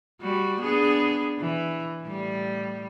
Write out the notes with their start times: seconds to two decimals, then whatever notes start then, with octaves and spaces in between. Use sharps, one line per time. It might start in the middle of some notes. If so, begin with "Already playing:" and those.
0.21 G3 F#4
0.60 B3 D4 G#4
1.40 E3
2.02 A2 G3